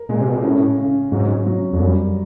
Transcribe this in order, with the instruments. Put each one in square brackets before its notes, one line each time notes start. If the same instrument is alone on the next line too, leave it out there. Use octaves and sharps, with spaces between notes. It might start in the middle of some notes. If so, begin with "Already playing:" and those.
Already playing: [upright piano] A#4
[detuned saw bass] A#2 [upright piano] G#3
[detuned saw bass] C3
B2
A#2
[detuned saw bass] A2 [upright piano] C#4
[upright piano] C#3
[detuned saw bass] G#2 [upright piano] F#3
[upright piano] F#3
[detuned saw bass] F2
[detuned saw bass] F#2 [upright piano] G3